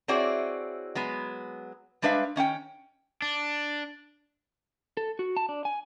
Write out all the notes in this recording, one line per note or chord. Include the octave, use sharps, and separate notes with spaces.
C4 E4 F#4 G#4 C#5 D5
F#3 G#3 B3
G3 G#3 D4 B4 E5 F5
D#3 C#4 F5 G5
D4
A4
F#4
A5
D4
G#5